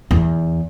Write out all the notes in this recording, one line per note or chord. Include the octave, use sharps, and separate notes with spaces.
E2